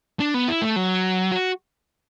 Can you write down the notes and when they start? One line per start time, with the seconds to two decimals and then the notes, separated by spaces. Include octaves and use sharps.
0.20 D4
0.34 B3
0.48 E4
0.62 A3
0.76 F#3
1.32 F#4